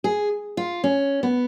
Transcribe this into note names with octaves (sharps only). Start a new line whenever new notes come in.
G#4
F4
C#4
B3